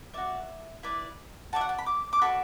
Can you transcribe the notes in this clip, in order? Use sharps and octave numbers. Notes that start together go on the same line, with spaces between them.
F#4 D5 E5
E4 B4 D5
F#4 D5 E5 A5
F#5
A5
B5
D6
D6
F#4 A4 D5 B5